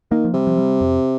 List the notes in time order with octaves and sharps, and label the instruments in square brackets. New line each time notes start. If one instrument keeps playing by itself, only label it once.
[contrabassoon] D#3 [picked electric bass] A#3
[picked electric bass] F3
[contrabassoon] C3 [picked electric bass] G3
[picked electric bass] F3
G3
F2